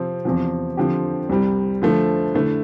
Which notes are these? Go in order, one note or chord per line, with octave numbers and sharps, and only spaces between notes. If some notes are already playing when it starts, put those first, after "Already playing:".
Already playing: C3 F3 C4
E2 C3 F3
D3 F3 C4 G4
C2 C3 G3
D3 F3 A3
D3 A3 E4